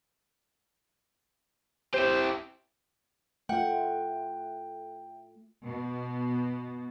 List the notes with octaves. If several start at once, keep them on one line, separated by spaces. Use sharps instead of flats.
E4 G4 C5
A3 F4 F#5 G5
B2